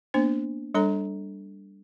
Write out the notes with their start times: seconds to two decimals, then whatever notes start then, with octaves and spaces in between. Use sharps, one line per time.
0.14 A#3 B3 D4 C5
0.74 G3 D4 A4 C#5 A#5